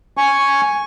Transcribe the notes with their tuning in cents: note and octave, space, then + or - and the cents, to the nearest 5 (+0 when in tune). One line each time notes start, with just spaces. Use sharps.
G#5 +0 C#6 +0